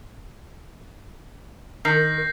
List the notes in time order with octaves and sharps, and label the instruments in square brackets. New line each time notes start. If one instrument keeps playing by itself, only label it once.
[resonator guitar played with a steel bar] D#3 [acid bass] A#4 [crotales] G6 A#6 C7